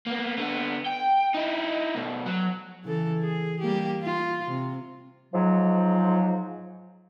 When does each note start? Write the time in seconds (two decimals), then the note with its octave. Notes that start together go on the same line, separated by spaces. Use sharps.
0.06 A#3 B3
0.37 D3 B3
0.86 G5
1.34 D#4 E4
1.95 B2 A3
2.26 F#3
2.84 C#3 E3 A4
3.21 G#4
3.61 G3 A#3 G4
4.03 F4
4.48 C3
5.33 G#2 F3 F#3